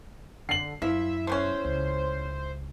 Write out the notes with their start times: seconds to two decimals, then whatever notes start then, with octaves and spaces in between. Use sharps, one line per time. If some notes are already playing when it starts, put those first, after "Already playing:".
0.49 D3 C7 F#7
0.82 F#2 F3 E4 E5
1.27 A3 B3 C#4 C5
1.65 C#2